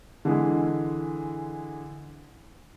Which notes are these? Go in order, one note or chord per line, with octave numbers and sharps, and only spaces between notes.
D3 E3 G#3